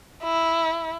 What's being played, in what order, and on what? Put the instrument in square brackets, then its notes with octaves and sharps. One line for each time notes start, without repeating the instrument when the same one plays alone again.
[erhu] E4